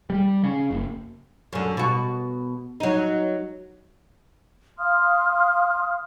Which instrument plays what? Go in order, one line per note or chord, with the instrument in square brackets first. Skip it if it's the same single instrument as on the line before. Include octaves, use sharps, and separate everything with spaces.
[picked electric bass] G3
C#3
F#1
[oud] F#2 D3
B2 F#4
F#3 D#4
[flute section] F5 C6 D#6 F6